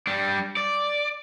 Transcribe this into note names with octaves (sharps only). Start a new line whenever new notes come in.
G3 D4
D5